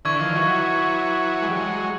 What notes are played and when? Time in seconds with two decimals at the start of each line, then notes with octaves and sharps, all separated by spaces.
0.05 D3 E3 C#6 E6 G#6
0.21 D#3 F3
0.35 E3 F#3
1.42 G#3
1.50 G3
1.57 F#3 G#3